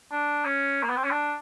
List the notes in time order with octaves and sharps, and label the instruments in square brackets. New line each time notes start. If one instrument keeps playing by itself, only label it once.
[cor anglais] D4
C#4
A#3
B3
C4
C#4
D4